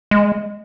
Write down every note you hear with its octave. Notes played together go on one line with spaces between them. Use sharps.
G#3